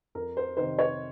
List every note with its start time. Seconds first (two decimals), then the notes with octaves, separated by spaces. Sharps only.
0.15 F2 A#4
0.37 C5
0.57 C3 D#3 C5
0.79 C#5